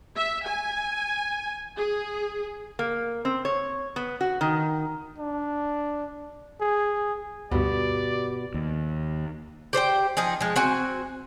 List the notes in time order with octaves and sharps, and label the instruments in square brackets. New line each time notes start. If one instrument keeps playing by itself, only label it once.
[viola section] E5
G#5
G#4
[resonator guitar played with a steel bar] A#3
C4
C#5
B3
F#4
D#3
[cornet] D4
G#4
[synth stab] D2 G2 [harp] B2 [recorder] G4 [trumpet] D5
[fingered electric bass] D#2
[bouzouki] G4 C5 D5 G5
F3 D#4 G#4
F3 G#3
C4 F#4 G#5